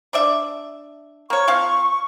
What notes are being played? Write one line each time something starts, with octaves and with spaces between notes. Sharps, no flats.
D4 D5 E5
A#3 C#5 C#6
F3 C4 F5